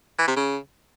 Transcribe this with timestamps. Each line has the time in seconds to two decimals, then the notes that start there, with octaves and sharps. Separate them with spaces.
0.19 E3
0.27 C3
0.36 C#3